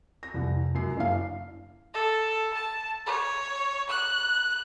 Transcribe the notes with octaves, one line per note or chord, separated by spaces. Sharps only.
A#6
C2 F2 C3 E3
C#2 F#2 C7
F#1 F#2 D4 E4 F5 C7
A4
A5
C#5
F#6